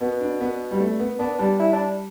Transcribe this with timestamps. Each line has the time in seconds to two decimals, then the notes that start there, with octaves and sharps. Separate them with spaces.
0.01 B2 B3
0.21 D4
0.41 B3
0.71 G3
0.80 A3
1.00 B3
1.19 B3 D4
1.39 G3 D4
1.59 E4
1.73 D4